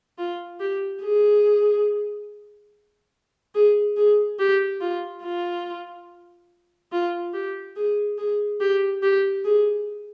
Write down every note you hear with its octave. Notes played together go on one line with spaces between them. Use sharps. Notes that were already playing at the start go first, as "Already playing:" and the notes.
F4
G4
G#4
G#4
G#4
G4
F4
F4
F4
G4
G#4
G#4
G4
G4
G#4